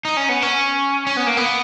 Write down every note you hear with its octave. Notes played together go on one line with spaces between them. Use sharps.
D#4
C#4
B3
C#4
C#4
B3
A#3
B3